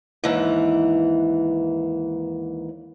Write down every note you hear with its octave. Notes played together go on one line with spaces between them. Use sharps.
D#2 G#2 E3